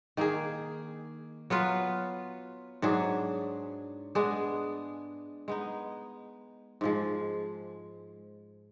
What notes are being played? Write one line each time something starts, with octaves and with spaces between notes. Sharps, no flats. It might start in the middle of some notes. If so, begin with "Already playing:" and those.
D#3 A#3 D#4 G#4
F#3 B3 F4 B4
G#2 F#3 D4 G#4
G#3 B3 D4 G#4
G#3 B3 D#4
G#2 F3 G#3